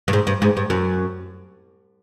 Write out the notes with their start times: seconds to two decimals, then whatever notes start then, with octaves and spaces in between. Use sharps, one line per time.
0.08 G2
0.13 G#2
0.27 G2
0.42 G#2
0.57 G2
0.70 F#2